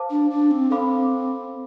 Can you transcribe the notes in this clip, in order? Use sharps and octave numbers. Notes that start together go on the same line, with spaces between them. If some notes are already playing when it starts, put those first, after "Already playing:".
Already playing: C5 F5 A5 D6
D4
D4
C4
C4 A4 C5 F5 B5 D6